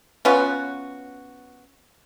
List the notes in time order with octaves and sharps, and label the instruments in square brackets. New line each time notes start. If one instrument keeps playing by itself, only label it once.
[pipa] B3 C#4 F4 F#4